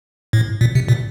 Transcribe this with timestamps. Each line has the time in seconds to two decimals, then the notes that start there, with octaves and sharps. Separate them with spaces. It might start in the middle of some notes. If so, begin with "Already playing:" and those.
0.33 A2
0.61 A#2
0.75 C3
0.88 A#2